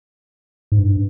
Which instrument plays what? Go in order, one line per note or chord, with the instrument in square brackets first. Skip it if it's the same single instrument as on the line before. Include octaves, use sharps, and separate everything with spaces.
[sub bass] G#2
G2